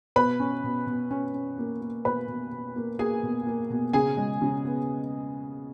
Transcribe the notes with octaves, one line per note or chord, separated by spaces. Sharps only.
B2 B4 B5
C#4
B2
B2
C#4
C#4
A#3
A#3
B2 B4 B5
B2
B2
A#3
A#3 G#4 G#5
B2
A#3
B2
C#3 G#4 G#5
G#3
C#3
B3